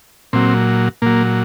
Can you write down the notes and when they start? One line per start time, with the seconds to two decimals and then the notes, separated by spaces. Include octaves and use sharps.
0.33 A#2 F#3 C4
1.02 A#2 F#3 A#3